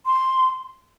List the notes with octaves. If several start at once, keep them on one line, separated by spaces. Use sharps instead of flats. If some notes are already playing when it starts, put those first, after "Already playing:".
C6